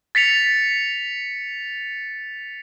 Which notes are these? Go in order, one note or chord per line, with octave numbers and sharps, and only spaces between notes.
A6 B6 C#7 F7